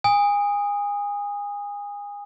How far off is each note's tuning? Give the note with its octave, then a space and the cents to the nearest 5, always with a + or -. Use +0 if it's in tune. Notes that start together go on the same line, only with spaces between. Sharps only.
G#5 -30 D#6 +0